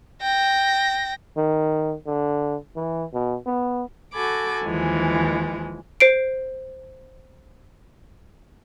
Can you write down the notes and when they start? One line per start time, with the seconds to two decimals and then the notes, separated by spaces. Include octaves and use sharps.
0.22 G5 A#6
1.37 D#3
2.06 D3
2.76 E3
3.13 B2
3.46 B3
4.14 F#4 A4 G#5 B5 D6
4.64 D#2 E3 F3 G#3
6.00 C5 C7 D7